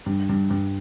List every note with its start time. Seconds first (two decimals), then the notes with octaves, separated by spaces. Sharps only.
0.06 G2
0.29 G2
0.50 G2